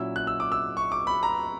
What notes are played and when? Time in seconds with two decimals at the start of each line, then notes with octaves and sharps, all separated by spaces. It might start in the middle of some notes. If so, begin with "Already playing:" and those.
Already playing: A#2 F#3 C#4 E4 E6
0.16 F#6
0.27 E6
0.40 D6
0.52 E6
0.77 C#6
0.92 D6
1.07 B5
1.23 A#5